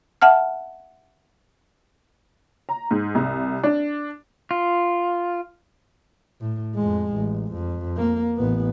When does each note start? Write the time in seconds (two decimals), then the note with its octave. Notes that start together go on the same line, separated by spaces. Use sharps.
0.22 E5 F#5 A5 F6
2.69 A#5
2.91 G#2
3.15 C2
3.63 D4
4.51 F4
6.41 A2
6.75 F2 G#3
7.13 A1
7.53 F2
7.96 A#3
8.37 A1 B3